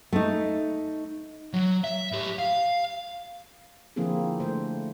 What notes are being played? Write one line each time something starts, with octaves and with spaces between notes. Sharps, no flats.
A3 D#4
F#3
E5
A2 G4
F5
D3 F3 A#3 C4 E4 G#4
D3 A3 C5